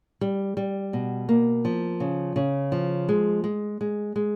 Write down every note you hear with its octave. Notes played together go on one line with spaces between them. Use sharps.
G3
G3
B2
A#3
F3
C#3
C#3
F3
G#3
G#3
G#3
G#3